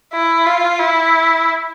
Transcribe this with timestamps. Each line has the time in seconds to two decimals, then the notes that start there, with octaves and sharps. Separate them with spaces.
0.13 E4
0.46 F4
0.79 E4